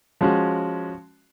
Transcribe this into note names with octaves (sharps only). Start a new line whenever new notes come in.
F3 G#3 C#4 F#4